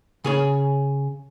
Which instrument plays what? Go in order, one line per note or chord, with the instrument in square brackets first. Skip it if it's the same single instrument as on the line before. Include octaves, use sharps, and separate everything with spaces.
[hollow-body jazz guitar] C#3 G#4 C#5